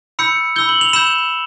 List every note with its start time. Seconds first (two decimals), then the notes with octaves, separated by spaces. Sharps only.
0.19 B5 E6 G6 C#7
0.56 B5 E6 G6 G7
0.69 F#7
0.81 F7
0.93 B5 E6 G6 E7